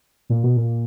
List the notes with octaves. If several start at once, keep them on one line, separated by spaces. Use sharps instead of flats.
A#2
B2
A#2